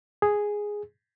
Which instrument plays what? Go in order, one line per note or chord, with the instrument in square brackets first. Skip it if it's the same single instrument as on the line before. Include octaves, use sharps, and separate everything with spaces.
[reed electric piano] G#4